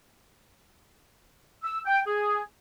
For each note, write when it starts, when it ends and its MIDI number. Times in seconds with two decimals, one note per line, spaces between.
1.64 1.80 88
1.86 2.01 79
2.07 2.40 68